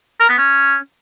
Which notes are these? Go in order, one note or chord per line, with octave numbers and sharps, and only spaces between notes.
A#4
B3
C#4